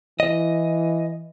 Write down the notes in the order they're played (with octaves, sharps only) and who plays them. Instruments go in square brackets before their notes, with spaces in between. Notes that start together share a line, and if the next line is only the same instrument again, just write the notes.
[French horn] E3 [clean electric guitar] D#5